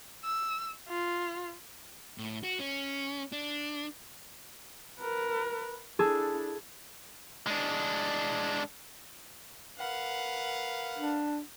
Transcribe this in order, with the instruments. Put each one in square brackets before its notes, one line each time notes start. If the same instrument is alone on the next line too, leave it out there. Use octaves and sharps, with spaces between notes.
[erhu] E6
F4
[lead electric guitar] A2
F#4
C#4
D4
[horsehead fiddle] A#4 B4
[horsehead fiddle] D4 E4 [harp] G#4 A4
[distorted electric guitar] G#3 D4
[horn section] A#4 B4 F5 [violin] F#5
[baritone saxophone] D4